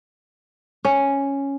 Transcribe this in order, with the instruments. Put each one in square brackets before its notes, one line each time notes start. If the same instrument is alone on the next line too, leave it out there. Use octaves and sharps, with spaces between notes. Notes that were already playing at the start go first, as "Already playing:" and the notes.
[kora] C#4